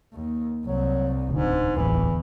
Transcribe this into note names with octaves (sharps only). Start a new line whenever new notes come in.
D#2
C2 F#3
D1 D2 G#2 D3
D1 A1 E2 E3